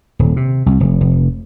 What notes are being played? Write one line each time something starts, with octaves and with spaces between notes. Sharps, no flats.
D#1
C3
C2
F1
F1